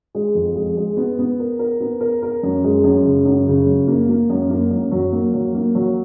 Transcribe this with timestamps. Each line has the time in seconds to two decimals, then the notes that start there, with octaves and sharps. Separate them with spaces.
0.15 G#3
0.35 F2
0.56 G#3
0.77 G#3
0.97 B3
1.19 B3
1.39 A#4
1.59 A#4
1.80 B3
2.01 A#4
2.23 A#4
2.43 F#2
2.64 G#3
2.84 F#2
3.05 C#3
3.25 F#2
3.47 C#3
3.67 F#2
3.88 A#3
4.09 A#3
4.30 F#2
4.50 A#3
4.71 F#2
4.91 F#3
5.13 A#3
5.34 F#3
5.55 A#3
5.75 F#3